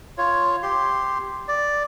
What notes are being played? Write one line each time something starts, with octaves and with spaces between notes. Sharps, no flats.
F4 C#5
G4 C6
D5